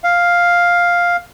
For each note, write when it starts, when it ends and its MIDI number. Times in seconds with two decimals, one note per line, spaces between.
0.04 1.16 77